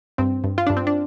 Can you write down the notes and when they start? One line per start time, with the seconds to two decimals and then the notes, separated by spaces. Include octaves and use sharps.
0.18 G2 C4
0.44 G2
0.58 F4
0.67 G2 D4
0.76 C4
0.87 D4